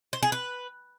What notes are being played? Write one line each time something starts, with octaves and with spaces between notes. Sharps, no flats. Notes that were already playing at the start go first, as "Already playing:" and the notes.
C5
G#4
B4